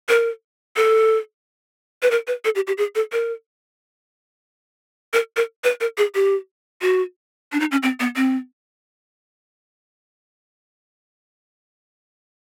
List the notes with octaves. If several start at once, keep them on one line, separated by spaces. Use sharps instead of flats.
A#4
A4
B4
A#4
B4
A4
G4
G4
G#4
A4
A#4
A#4
A#4
B4
A#4
G#4
G4
F#4
D4
D#4
C#4
C4
B3
C4